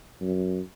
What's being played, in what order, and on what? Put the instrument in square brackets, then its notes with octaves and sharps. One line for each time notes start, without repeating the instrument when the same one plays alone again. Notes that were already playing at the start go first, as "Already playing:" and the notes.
[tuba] F#2